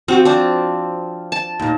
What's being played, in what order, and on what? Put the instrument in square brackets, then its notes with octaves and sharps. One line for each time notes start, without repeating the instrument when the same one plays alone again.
[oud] F3 F#4 [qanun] C4
[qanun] C4 D4
A5
[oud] D#2 A#2